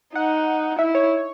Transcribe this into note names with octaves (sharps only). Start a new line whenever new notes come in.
D#4 F#5
E4 E5
C#5